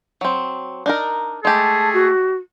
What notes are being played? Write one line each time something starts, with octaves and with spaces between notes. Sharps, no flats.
F#3 C4
D4 D#4 A#4
G#3 A3 G4 G#4 A5
F#4